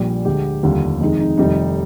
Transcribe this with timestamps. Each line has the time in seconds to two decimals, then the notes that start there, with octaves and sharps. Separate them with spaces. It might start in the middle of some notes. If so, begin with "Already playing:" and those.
Already playing: A#1 A#2 G3 G4
0.25 D2 D3 G#3 G4
0.63 F1 D#2 D3 G3 F4
1.00 F2 C3 D#3 G#3 D#4
1.20 D#4
1.38 F1 F2 C3 D#3 G3 D#4